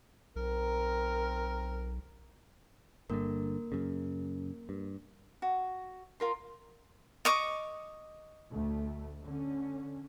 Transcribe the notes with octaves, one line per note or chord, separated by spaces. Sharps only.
B1 C4 A#4
G1 G2 D3 A#3 A#4
F#2 C#3
G2
F#4
F4 A#4 C6
D#5 C#6 D6
D2 A3
D3 C#4